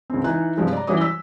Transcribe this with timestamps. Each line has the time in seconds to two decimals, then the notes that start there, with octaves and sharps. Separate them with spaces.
0.10 C#2 C4
0.24 E3 D#4 G#5 F#6
0.57 G2 C3 F3 G3 G#3
0.73 D5 A#5
0.87 E3 F#3 G3 C#4 D6 D#6
1.01 E6 B6